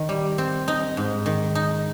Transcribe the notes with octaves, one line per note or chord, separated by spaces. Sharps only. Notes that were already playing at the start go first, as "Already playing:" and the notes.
Already playing: D#3
G3
C4
D#4
G#2
D#3
D#4